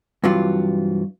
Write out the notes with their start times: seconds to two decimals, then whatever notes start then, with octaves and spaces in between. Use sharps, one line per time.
0.24 G2 C3 E3 F#3 F4